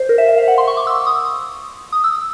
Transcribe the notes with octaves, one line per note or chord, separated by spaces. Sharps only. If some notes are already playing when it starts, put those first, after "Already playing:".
Already playing: C5
A#4
E5
E5
F5
F#5
C6
C#6
D6
E6
D#6
D#6
E6